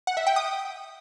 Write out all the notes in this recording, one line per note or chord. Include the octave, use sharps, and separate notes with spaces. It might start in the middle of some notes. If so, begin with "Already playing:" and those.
F#5
E5
G5
D#6